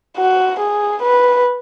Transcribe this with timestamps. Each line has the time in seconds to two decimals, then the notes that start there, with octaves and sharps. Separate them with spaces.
0.17 F#4
0.59 G#4
1.02 B4